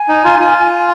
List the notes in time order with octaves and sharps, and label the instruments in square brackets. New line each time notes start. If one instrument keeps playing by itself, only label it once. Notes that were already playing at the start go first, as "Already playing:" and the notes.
Already playing: [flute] G#5
[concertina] D#4
F4
F4